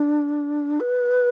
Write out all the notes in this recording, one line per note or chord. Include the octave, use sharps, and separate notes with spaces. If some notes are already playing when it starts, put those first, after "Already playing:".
Already playing: D4
B4